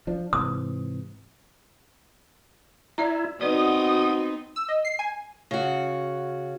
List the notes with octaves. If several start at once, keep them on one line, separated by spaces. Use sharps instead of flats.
F3 D4
G#2 C3 E3 D#6
E4 D5 E5 A#5
B3 C4 D#4 F#4 B4 D5 D#6
E6
D#5
C7
G#5
C#3 F#4